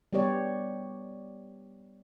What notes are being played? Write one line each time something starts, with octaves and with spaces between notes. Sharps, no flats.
G3 B3 G4 C#5 D5